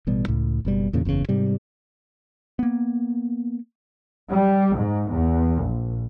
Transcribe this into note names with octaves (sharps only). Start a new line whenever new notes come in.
A1 B2 G3
C#2 A2
F#1 B2 G3
E2 A#2 C#3
F#1 E2 A2 C#3
G#2 C3 G3
A#3 B3
G3
G#2
E2
A#1